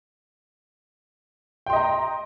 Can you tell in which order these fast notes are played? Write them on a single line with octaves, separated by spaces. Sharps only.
G5 C6 D#5 A#5